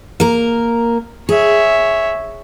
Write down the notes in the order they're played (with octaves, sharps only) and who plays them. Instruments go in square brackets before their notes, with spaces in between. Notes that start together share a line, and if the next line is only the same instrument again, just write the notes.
[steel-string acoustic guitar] A#3 A#4
[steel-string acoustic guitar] G#4 [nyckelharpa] C#5 E5